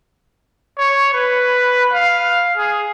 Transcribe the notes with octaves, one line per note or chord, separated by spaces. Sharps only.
C#5
B4
F5
G#4